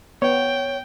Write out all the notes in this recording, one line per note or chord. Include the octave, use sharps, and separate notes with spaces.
B3 C#5 G5